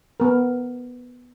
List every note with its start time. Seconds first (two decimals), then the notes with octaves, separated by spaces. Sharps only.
0.20 B3 A#4